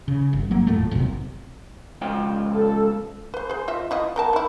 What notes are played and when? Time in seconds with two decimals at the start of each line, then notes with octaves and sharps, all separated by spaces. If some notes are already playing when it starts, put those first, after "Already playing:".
0.08 C#3
0.33 G1
0.51 F#3 A#3
0.67 D#1 F2 A2 A3
0.91 F#1 B1 F#2 C3
2.02 C#2 F3 G5
2.53 A4
3.34 B4 C5
3.49 G#4 C5
3.68 F4 D#5 E5
3.91 E4 F4 D#5
4.16 B3 A#4 A5
4.33 D#3 E4